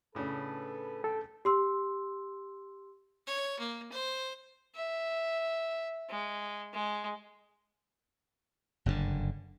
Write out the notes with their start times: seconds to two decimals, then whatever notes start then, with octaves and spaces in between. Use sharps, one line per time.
0.15 A2 C#3 D4 A4 B4
1.04 A4 G5
1.45 G4 C6 E6
3.27 C#5
3.59 A#3
3.92 C5
4.76 E5
6.10 G#3
6.73 G#3
8.86 F#1 G2 A#2 D3